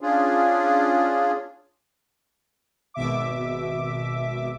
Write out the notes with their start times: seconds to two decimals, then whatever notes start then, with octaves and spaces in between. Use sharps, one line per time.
0.01 C#4 D4 F4 G#4
2.94 G#1 B2 E5 D6